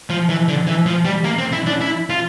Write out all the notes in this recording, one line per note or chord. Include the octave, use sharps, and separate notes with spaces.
F3
E3
D3
E3
F3
G3
A#3
C4
E4
D4
E4
F4